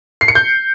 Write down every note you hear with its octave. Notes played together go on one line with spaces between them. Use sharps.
C7
C#7
G6